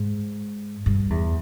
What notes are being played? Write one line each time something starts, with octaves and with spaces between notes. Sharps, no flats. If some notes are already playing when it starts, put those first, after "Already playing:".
Already playing: G#2
G2
E2